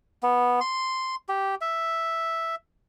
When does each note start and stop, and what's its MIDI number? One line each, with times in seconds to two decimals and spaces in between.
0.23 0.60 59
0.61 1.15 84
1.29 1.55 67
1.61 2.55 76